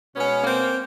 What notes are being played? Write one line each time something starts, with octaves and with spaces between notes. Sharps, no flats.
B2 G#3 B3 C#4
A#3 C4